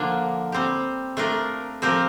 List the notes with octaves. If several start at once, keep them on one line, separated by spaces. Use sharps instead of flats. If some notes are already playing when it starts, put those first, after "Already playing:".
Already playing: D3 F3 A#3 D4
G3 C4 G4
A3 D4 F4 A#4
F3 C4 G4 A#4